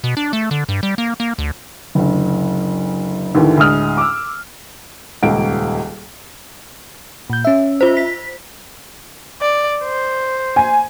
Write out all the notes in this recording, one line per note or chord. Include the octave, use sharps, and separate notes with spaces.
B2
D4
A3
D3
G2
G3
A#3
A#3
D2
F#1 D2
D#2 A2 D3 E3
D2 A2 G#3 D#6 F6
D6 E6
D#1 C#2 D7
A#2 G6
C#4 E5
F4 C5
B6
D5
C5
G#5